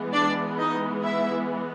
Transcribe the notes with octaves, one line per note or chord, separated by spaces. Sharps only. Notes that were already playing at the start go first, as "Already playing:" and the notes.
Already playing: E3 G#3 B3
D4 D5
D#4 D#5
E4 E5